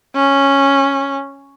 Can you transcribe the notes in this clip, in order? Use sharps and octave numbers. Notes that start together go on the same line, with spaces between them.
C#4